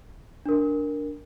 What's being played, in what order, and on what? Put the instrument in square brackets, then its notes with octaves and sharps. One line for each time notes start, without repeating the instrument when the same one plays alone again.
[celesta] D4 A#4